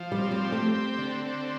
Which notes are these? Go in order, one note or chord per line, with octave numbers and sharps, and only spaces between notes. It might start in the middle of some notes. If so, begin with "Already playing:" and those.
Already playing: F3
G3
C4
G3
G4
A3
C4
D3
C4